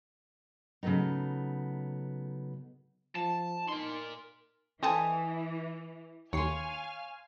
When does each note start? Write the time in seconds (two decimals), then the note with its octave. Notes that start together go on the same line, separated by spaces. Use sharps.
0.83 C#3 F#3 A3 B3 D#4
3.15 F3 A5
3.68 D#4 A#4 C6
4.83 E3 C4 A4 D#5 G#5 A5
6.33 D#2 C#5 F5 G#5 C6 F6 C7